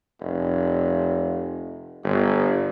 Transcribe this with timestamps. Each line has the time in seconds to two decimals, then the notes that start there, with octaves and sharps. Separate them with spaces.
0.20 F1
2.04 G1